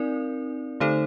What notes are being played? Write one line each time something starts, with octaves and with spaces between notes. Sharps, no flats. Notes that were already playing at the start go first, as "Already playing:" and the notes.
Already playing: C4 D#4 A#4 D5
D3 A3 D#4 A4 C5